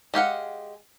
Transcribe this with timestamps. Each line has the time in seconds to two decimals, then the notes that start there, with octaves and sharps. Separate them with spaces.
0.14 G#3 G4 F5 F#5